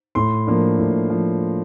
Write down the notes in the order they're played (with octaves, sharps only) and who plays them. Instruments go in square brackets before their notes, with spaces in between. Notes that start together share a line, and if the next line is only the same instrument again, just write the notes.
[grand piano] A2 C6
F3 A#3 D4
A2
F3